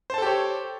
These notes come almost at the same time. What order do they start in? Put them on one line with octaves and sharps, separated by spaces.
C5 A5 A4 G4 C#5